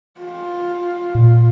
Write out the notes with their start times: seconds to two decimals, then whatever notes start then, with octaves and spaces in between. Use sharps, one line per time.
0.20 F4
1.15 A#2